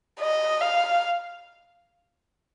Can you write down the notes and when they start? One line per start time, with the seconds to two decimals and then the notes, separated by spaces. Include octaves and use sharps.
0.20 D#5
0.61 F5